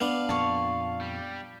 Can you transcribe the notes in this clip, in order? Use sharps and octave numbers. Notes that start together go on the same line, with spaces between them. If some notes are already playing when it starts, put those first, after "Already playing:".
B3 D4 F5
F2 A#2 A5 C#6
G3